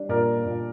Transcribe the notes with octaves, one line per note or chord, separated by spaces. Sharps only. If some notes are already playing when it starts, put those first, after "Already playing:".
Already playing: G3 D4
A#2 A#4 D5
A#2